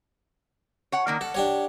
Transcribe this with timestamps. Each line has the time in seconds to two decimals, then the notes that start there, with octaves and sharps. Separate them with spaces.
0.92 C#5 F#5
1.07 D#3 A#3 D5
1.21 A4 F#5
1.35 D4 G4 C#5